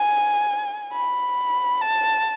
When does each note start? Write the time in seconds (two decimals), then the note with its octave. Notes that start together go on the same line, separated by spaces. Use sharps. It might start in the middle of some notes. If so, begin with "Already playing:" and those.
Already playing: G#5
0.93 B5
1.81 A5